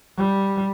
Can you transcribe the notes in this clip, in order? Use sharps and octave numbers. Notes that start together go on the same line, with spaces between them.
G3